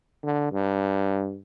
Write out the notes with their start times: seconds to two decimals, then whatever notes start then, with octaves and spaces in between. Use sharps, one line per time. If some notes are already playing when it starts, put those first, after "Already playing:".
0.24 D3
0.52 G2